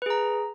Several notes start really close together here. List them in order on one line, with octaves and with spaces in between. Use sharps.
B4 G#4 A#5